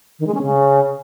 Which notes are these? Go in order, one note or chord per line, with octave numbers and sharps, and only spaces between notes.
D#3
G#3
C#4
C#3